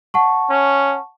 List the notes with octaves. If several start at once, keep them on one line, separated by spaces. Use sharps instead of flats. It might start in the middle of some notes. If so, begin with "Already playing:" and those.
F#5 A5 C#6
C#4